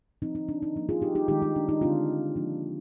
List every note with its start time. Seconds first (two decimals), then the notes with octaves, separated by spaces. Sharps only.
0.22 F3 C4 D#4
0.35 D#4
0.49 D4
0.63 D#4
0.76 F3 A#3 D4
0.89 F4 G#4
1.02 D#4 G4
1.15 D#4 G4
1.28 D#3 G#3 D4 D#4 G4
1.42 D#4
1.56 D4
1.69 D#4
1.81 D3 G#3 C4 D4 F4
2.36 F3 A#3 D4